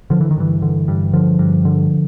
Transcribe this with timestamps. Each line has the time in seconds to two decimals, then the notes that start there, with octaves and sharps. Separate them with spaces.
0.10 D3 F3
0.21 E3
0.31 D#3
0.37 G2 E3
0.62 D3
0.88 G2
1.13 D3 F3
1.39 G2
1.65 D3